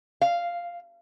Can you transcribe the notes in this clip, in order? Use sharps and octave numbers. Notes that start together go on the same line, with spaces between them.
F5